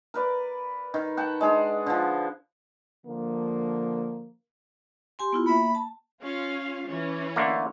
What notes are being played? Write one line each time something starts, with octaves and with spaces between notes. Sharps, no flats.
A#4 B4 D5
D#3
F#5 G5 A5
G#3 D4 G#4
D3 F3
D3 F3 A#3
G4 G#5 C6
B3 E4 F4
A#3 E5 B5
A5
C#4 F4 F5
E3 C#4
D3 A3 A#3